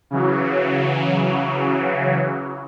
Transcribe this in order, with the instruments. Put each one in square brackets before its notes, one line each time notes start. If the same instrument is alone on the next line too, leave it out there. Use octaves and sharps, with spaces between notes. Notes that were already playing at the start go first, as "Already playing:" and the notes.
[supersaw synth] C#3 E3 F#3